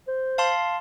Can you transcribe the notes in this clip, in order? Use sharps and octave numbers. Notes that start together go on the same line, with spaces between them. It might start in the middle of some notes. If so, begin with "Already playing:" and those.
C5
F5 A5 C6